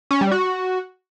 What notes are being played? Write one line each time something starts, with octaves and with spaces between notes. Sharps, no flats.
C#4
G3
F#4